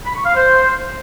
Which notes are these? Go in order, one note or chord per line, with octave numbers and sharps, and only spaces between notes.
B5
C#6
F5
C5